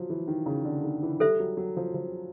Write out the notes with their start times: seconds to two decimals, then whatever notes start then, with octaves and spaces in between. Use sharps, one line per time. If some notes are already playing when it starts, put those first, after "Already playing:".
Already playing: F3 F#3
0.10 E3
0.28 D#3
0.46 C#3
0.65 D3
0.84 D#3
1.03 E3
1.20 G3 A4 C5 E5
1.40 F#3
1.57 F#3
1.77 F3
1.94 F3